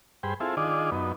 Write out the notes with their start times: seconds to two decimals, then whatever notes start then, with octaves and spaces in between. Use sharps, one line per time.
0.23 G2 G#4 C5 G5 B5
0.40 C4 E4 F4 G#4 A4
0.57 D#3 D4 F4 G#4 D5 D#5
0.91 F#2 B3 D#4